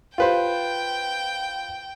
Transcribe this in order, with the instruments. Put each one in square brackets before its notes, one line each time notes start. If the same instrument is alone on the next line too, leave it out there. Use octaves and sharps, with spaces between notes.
[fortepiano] F4 B4 C5 [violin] G5